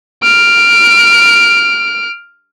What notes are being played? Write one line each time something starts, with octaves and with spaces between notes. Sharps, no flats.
F6 D7